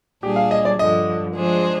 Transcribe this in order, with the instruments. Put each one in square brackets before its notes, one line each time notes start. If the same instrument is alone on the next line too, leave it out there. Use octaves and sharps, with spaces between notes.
[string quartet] A#2 G3 D4 G#4 [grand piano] G4
[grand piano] F5
D#5
D5
[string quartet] G2 D3 F3 [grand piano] D#5
[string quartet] F3 G#3 D4 G#4 C5